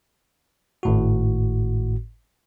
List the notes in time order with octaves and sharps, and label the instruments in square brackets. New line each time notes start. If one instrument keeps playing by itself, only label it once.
[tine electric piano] G#1 A2 F#4